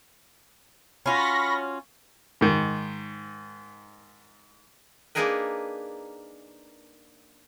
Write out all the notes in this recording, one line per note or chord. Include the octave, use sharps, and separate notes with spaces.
C#4 F4 F#4 B5 C#6 A#6
G#2 D#3
A#3 D4 D#4 G#4 A#4 B4